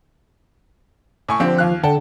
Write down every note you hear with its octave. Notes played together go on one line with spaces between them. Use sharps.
A2 G#5 C#6
D3 F3 C4 G4
D#2 F5 F#6
D3 F#5 G5 A5